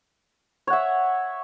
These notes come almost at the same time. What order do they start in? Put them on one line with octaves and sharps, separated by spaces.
C#5 F#5 E5